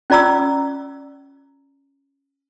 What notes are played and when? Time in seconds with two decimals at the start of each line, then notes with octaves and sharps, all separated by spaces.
0.10 C#4 F4 D5 A#5 C#6 E6